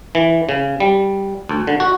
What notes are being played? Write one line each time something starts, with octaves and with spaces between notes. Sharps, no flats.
E3
C#3
G3
D2
D3
F#4